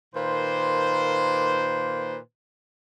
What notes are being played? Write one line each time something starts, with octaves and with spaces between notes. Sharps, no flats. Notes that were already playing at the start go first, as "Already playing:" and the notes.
A#2 D#3 A#3 B4 C5